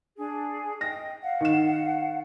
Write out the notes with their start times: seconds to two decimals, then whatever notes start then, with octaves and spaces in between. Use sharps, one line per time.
0.17 D4 G#4
0.81 D#5 G5 A#6
1.23 F5 F#5
1.41 D#3 E7